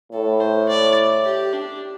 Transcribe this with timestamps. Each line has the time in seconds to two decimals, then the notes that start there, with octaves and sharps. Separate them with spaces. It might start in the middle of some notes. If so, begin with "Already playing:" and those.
0.12 A2 A4
0.40 C5
0.69 D5
1.25 G4
1.53 D4